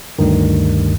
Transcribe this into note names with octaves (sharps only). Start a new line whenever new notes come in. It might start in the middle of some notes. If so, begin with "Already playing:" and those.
D2 G2 D#3